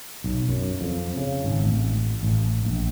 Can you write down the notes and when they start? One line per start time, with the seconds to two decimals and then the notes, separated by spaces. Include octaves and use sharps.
0.24 B1
0.48 F#2
0.81 F2
1.17 C#3
1.44 G#1
1.65 A1
2.23 A1
2.65 A#1